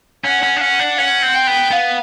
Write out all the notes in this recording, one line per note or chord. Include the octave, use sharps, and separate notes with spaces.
C#4 F#5
C#4
D4
C#4 F#5
D4
C#4 F#5
C4
G5
B3
B3 F5